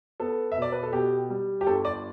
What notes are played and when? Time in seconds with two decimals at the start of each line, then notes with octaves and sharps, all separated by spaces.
0.20 B3 A4
0.52 E5
0.57 B2 D5
0.72 B4
0.83 A4
0.93 B2 G4
1.30 G3
1.61 G4
1.67 G1 A4
1.85 D5